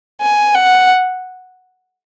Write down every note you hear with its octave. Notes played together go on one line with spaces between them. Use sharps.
G#5
F#5